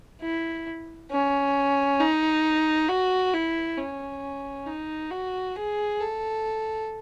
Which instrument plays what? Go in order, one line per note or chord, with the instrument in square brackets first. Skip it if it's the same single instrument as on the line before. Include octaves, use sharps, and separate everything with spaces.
[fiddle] E4
C#4
D#4
F#4
E4
C#4
D#4
F#4
G#4
A4